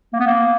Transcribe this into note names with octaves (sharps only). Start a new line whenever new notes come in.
A#3
B3
A#3